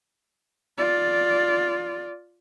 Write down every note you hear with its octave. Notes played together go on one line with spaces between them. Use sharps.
F4 D5